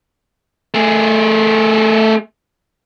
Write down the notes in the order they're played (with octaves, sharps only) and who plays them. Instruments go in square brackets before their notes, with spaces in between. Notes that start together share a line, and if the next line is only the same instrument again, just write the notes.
[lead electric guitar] A3 G#4